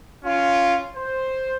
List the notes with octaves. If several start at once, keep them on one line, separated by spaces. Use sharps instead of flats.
C#4 F4
C5